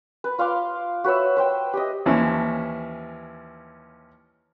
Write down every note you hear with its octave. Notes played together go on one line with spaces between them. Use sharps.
B4
F4 F5 C6 D6
F#4 B4 C#5 E5
B4 C5 G5
G4 D#5
D#2 E3 F3 C#4